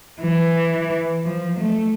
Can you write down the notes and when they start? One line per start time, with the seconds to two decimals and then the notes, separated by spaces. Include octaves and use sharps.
0.21 E3
1.24 F3
1.59 A3